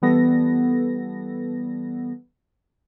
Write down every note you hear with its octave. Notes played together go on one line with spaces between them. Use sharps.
E3 G3 B3 A4 A#6